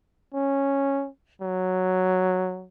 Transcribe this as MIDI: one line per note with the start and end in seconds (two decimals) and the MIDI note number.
0.35 1.09 61
1.42 2.68 54